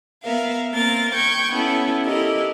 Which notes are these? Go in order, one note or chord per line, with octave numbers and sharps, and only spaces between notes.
B3 A#4 E5 F5
A#3 C4 A#4 A6
G5 C#6 G6 G#6
B3 C#4 E4 A4
E4 G4 A4 A#4 D#5